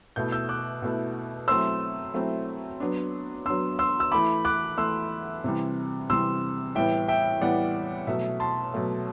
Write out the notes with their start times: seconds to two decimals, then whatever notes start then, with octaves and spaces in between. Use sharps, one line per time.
0.16 B2 A3 E4 G6
0.32 E6 G6
0.49 D6 F#6
0.82 B2 A3 E4
1.48 F#3 A3 C4 E4 C6 E6
2.14 F#3 A3 C4 E4
2.80 F#3 B3 D4
3.46 F#3 B3 D4 C6 E6
3.79 C6 E6
4.00 E6
4.12 E3 A3 E4 B5 D6
4.45 D6 F#6
4.77 E3 A3 E4 C6 E6
5.44 C3 E3 G3
6.10 C3 E3 G3 C6 E6
6.75 A2 E3 G3 B3 E5 G5
7.08 E5 G5
7.41 A2 E3 G3 B3 D5 F#5
8.07 B2 F#3 A3 E5
8.40 A5 C6
8.74 B2 F#3 A3